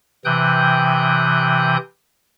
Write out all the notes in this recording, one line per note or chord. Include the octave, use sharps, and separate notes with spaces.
C3 E3 G5 D#6 F#6 G6